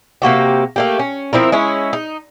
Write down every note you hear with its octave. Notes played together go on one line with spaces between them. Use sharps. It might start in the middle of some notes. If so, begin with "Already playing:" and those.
C3 A#3 F#4 G4
A3 A#3 G4
C#4
F3 C4 E4 A#4
G#3 C#4 E4
D#4